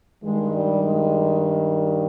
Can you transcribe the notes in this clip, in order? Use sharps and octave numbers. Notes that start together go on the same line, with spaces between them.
G2 D#3 G#3
G3
G#3